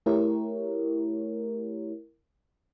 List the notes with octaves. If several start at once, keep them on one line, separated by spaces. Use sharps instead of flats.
A3 E4 G4 A#4 C#5